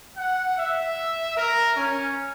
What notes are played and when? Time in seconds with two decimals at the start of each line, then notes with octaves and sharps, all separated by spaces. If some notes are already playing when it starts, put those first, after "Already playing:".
0.17 F#5
0.58 E5
1.37 A#4
1.77 C#4